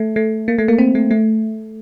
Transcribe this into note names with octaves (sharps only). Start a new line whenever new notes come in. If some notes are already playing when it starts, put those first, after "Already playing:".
Already playing: A3
A3
A#3
A3
A#3
C4
A3
A3